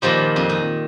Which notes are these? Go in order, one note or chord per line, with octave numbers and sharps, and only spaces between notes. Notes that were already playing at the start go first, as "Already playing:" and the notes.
A#2 D#3 F3 G3
F2
D#3